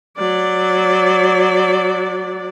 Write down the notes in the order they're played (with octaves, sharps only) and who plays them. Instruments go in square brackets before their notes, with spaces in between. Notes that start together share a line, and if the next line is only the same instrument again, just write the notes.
[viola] F#3 D5